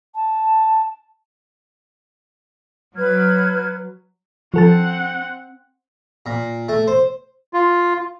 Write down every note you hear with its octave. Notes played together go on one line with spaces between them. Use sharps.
A5
F#3 B4 F6 G#6
F3 C4 A4 F#5 A5
A#2
A3
C5
F4